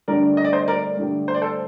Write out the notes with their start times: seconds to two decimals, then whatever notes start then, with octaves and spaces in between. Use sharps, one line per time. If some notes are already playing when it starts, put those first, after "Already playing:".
0.08 G2 D3 A3 D4 G4 A#4 D5
0.37 D#5
0.45 D5
0.53 C5 D#5
0.68 A#4 D5
0.97 G2 D3 A3 D4 G4
1.28 C5
1.35 D5
1.42 A4 C5